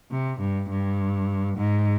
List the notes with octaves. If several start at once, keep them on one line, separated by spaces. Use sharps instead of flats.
C3
G2
G2
G#2